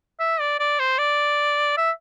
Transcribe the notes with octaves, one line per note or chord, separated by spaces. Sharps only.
E5
D5
D5
C5
D5
E5